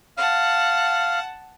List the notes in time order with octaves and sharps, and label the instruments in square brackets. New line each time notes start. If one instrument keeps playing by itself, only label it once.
[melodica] F5 [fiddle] F#5 A5